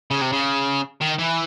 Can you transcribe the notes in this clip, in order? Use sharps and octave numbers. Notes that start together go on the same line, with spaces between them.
C#3
C3
C#3
D#3
E3